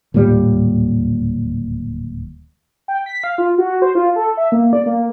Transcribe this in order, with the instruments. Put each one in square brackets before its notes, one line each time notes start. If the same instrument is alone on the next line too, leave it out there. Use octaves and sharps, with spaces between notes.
[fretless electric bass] D1 D#2 A#2 G3
[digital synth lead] G5
B6
F5
F4
F#4
C5
F4
A4
E5
A#3
D5
A#3